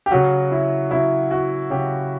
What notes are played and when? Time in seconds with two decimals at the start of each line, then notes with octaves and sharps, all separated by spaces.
0.06 G4
0.11 C#3 F#3 F#4
0.52 E4
0.91 C#3 F#3 E4
1.31 F#4
1.70 C#3 F#3 G4